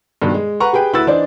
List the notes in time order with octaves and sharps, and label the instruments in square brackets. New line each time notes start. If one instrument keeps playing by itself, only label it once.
[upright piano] G2 B2 D#3
G#3
B4 F#5 A#5 C#6
G4 G#4 B4 G5
D2 E4 F#4 B4 E6 A6
E3 D4 D#4 C5 D5